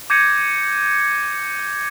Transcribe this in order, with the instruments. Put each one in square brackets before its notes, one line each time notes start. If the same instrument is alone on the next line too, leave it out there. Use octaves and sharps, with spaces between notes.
[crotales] D6 G6 G#6 A#6 C#7 D#7